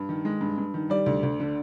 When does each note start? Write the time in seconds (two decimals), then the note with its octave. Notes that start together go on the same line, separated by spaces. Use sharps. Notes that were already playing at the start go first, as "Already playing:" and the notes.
Already playing: G2
0.09 D#3
0.25 G#3
0.41 G2
0.58 G2
0.74 D#3
0.90 G3 D5
1.06 D2
1.23 D2
1.40 D3